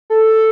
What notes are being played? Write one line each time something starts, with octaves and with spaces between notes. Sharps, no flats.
A4